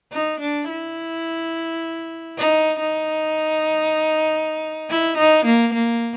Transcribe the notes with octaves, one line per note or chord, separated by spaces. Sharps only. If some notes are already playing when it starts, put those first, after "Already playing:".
D#4
D4
E4
D#4
D#4
E4
D#4
A#3
A#3